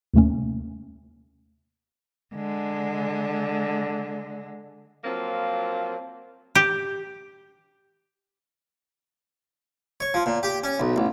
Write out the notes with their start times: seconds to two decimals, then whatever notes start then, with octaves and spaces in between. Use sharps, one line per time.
0.14 D#2 A2 C3 A3 A#3 C#4
2.35 D3 G#3
5.04 F3 F#3 A#3 C4 F4
6.55 G4
10.00 C#5
10.14 F3
10.26 A#2
10.43 G4
10.64 C#4
10.80 B1
10.96 A1